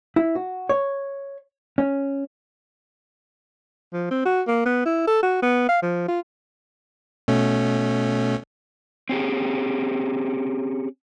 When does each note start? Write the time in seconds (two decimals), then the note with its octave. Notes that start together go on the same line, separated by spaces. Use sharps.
0.16 E4
0.35 F#4
0.69 C#5
1.78 C#4
3.93 F3
4.11 C4
4.25 F#4
4.48 A#3
4.66 B3
4.86 E4
5.07 A4
5.23 F#4
5.42 B3
5.69 F5
5.82 F3
6.08 F4
7.28 B2 A3 C#4
9.09 C4 C#4 G4 G#4